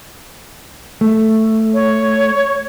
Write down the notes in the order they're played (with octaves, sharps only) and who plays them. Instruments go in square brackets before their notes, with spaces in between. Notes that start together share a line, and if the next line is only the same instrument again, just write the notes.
[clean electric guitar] A3
[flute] C#5